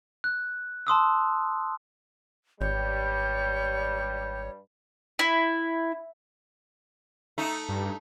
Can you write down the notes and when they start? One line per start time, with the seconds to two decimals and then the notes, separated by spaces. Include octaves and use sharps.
0.24 F#6
0.87 A5 C6 D#6 E6
2.61 G#1 G2 G3 C#5 G6
5.19 E4
7.38 A3 D#4
7.69 G2